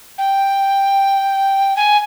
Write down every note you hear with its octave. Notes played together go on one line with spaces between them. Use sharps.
G5
G#5